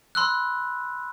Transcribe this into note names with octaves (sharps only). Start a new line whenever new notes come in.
B5 C6 E6 F#6